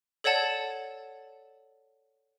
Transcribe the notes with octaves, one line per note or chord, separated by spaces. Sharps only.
A4 C#5 D5 F#5 A5 A6